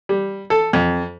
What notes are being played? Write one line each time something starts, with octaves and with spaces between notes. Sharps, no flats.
G3
A4
F2